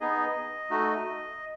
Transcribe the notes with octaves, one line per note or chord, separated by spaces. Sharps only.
B3 D#4 G#4 D#5
A3 D#4 F#4